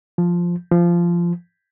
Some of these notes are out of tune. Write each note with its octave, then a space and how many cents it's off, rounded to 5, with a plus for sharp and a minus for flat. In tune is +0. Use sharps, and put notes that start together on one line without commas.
F3 +0
F3 -15